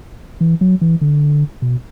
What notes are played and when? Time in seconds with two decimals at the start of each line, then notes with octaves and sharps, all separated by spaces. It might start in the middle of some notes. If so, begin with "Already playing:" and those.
0.41 E3
0.61 F#3
0.81 E3
1.01 D3
1.62 B2